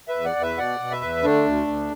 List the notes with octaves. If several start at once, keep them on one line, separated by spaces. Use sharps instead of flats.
B4 E5
E2
D5 F#5
E2
B4 E5
B2 D5 F#5
B2
B4 E5
E2
D3 A3 D4
D2
D2